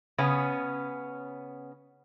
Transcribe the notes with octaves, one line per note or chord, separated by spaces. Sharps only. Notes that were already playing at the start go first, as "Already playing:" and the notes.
C#3 B3 C#4